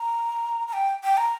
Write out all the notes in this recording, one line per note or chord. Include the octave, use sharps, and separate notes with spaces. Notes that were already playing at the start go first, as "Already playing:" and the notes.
Already playing: A#5
A#5
G5
G5
A#5